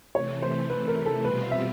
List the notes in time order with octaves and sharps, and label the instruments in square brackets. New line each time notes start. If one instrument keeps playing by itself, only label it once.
[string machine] C3 E3 A3 [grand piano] C#5
[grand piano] C5
B4
A#4
A4
[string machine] B2 G3 C4 F4 [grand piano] B4
[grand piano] E5